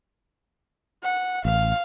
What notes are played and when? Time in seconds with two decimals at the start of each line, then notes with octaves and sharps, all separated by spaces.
1.03 F#5
1.45 A1 F5